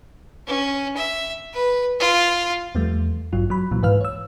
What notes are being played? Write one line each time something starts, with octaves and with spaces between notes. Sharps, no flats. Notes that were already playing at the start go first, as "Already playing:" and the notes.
C#4
E5
B4
F4
E2 F3 G3 A3
A1 G2 F#3 F4
F#3 B5
C2 A#2 E3 F#3
G#2 E3 B4 F5 F6
C#5 E6